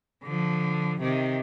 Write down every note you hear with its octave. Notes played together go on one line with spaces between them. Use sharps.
D3 F3
C3 D#3